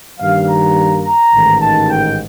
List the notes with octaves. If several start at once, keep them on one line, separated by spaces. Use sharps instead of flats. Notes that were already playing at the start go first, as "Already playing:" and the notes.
G2 D#3 G3 A#3 F5
A#5
A#5
A1 G#2 D#3
A5
G5